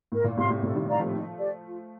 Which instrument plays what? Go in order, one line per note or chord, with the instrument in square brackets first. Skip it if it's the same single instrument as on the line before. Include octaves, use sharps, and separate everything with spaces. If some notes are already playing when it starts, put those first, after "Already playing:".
[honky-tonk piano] A2 [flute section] A#4
[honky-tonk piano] A#2
[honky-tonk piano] A2 C3 [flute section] F5 C6
[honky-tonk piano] A2 C3
[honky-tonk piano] A2 C3 [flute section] A4
[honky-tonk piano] D#3 G3
[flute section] D5 F5 A#5
[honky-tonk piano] F3 A3
[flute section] D#4
G4 D5
F4